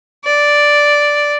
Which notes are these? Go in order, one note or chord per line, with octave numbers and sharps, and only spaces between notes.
D5